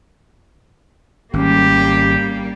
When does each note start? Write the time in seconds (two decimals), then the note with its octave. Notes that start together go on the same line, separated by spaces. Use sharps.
1.33 G#1 G3 A#3 C#4 G4